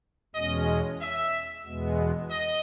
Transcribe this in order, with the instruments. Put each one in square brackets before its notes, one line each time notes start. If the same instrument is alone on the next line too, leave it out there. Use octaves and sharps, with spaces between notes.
[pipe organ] E2 B2 G#3 C#4 [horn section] D#5
[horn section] E5
[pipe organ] E2 B2 G#3 B3
[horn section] D#5